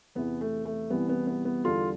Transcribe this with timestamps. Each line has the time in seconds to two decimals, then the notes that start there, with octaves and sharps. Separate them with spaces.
0.15 E2 C3 E3 B3
0.41 A3
0.65 A3
0.90 C2 C3 E3 G3 B3
1.09 B3
1.27 B3
1.45 B3
1.64 E2 D3 G3 F4 A4